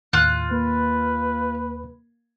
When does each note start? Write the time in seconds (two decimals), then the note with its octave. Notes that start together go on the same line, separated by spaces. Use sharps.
0.13 D#2 A2 F4 F#6
0.51 A#3 B4